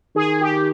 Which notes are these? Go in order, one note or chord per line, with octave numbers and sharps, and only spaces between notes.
D#3 G#4
G4